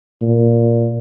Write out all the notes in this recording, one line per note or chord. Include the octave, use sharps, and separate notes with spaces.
A#2